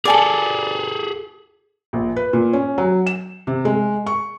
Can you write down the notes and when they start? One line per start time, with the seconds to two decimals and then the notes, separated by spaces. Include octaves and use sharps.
0.05 G#4 A4 D5 G#5 A5
1.93 A#1
2.16 B4
2.33 A#2
2.53 C#4
2.78 F#3
3.06 E7
3.47 C3
3.65 G#3
4.06 C#6